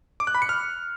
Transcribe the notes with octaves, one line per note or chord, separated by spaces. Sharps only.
D6
F#6
B5
C#7
F6